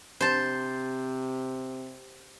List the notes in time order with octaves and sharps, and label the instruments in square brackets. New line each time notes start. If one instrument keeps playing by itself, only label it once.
[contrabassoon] C3 [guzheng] C5 A5